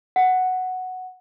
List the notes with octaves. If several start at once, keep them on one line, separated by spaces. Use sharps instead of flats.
F#5